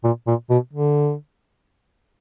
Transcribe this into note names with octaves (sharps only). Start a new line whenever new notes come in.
A#2
A#2
B2
D3